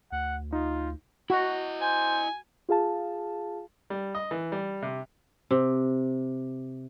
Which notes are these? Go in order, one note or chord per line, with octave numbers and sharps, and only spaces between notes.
D2 F#5
D#4 F4
E4 F#4 D#5
C5 G#5
F4 G#4 F5 A5
G3
D#5
E3
G3
C3
C3